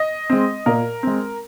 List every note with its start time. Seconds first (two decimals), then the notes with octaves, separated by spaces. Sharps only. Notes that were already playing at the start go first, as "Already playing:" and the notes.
Already playing: D#5
0.30 G#3 C4
0.66 A#2 A#4
1.03 G#3 C4